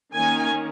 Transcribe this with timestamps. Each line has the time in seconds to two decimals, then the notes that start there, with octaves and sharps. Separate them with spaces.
0.14 D#3 A#3 C#4 G#5